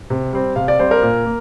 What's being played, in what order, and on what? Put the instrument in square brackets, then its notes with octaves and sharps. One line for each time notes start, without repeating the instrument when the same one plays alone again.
[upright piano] C3
G3 C4
[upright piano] C3 [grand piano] F5
[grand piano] D5
[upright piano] G3 C4 [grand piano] C5
[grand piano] A#4
[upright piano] A#2
A#3